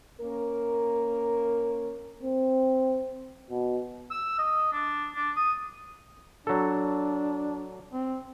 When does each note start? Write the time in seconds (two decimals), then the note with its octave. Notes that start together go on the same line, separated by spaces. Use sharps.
0.21 A#3 C#4 A#4
2.23 C4
3.51 B2
4.11 E6
4.38 D#5
4.73 D4
5.15 D4
5.36 D#6
6.47 F#3 D4 A4
7.93 C4